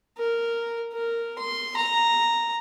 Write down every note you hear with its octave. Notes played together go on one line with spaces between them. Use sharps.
A#4
A#4
C6
A#5